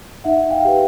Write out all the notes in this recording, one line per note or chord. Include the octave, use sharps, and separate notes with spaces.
D#4 E5 F#5
F5 G5
G4 B4